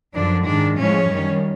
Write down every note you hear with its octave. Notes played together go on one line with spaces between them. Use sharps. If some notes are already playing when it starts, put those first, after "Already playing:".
F#2 D3 F3 D4
G#2 D#3 G#3 D4
A2 F3 G#3 C#4
F#2 D#3 G3